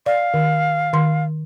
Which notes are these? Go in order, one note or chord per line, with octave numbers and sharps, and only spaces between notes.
D5 F5
D#3
D#3 C6